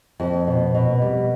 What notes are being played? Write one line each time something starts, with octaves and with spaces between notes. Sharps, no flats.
F2
B2
B2
G3